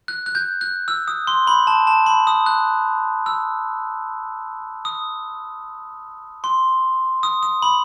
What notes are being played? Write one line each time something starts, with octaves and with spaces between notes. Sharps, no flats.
F#6
F#6
G6
F#6
E6
D#6
C6
B5
A5
A5
B5
D#6
F#6
E6
D#6
C6
D#6
D#6
B5